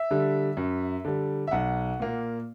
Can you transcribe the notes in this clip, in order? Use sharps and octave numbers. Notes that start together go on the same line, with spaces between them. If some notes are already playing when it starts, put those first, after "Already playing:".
Already playing: E5
D3 G3
F#2
D3 G3
E5
B1 F#5
A#2 A#3